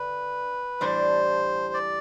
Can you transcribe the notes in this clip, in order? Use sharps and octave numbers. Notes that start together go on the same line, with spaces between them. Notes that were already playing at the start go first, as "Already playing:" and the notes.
Already playing: D3 B4
A2 E3 G3 D4 G4 C5
D5